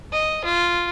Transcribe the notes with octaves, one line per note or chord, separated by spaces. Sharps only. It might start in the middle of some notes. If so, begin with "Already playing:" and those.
D#5
F4